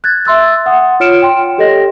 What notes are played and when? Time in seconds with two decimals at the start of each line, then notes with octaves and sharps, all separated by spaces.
0.04 F#6 G#6 A6
0.25 E5 C6 E6 A6
0.66 F#5 D#6
1.00 F4 C#5 F6 C#7 D7 E7
1.22 G5 C6
1.58 G4 A4 C#5 D#5 A#6